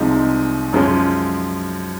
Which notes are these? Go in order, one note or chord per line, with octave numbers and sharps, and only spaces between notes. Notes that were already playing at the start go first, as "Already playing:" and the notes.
Already playing: C2 C3 F3 G#3 D#4
F#2 F3 G#3 C#4